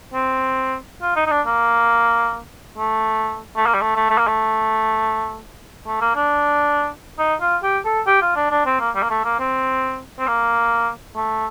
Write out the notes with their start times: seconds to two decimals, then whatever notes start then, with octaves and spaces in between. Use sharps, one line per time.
0.14 C4
1.01 F4
1.16 D#4
1.26 D#4
1.31 D4
1.46 A#3
2.78 A3
3.56 A3
3.66 A#3
3.74 G3
3.81 A3
3.96 A3
4.10 A3
4.18 A#3
4.27 A3
5.86 A3
6.01 A#3
6.15 D4
7.19 D#4
7.41 F4
7.63 G4
7.85 A4
8.07 G4
8.22 F4
8.36 D4
8.51 D4
8.66 C4
8.80 A#3
8.95 G3
9.02 A#3
9.10 A3
9.24 A#3
9.39 C4
10.19 C4
10.27 A#3
11.15 A3